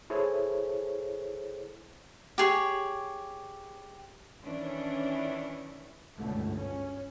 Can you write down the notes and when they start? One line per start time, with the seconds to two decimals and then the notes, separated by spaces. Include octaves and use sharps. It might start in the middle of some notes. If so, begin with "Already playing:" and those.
0.10 E4 G#4 A4 C5 C#5
2.38 G4 G#4 C#5
4.42 D#3 E3 C#4 D4
6.17 G1 C#2 G#2 B2 D3 A3
6.56 C#4